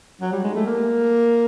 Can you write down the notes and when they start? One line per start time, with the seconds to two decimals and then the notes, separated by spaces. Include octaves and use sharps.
0.21 F#3
0.32 G3
0.44 G#3
0.55 A3
0.66 A#3